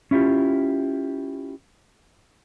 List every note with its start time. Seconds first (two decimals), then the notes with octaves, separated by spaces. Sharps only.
0.11 C#4 E4 F4 G4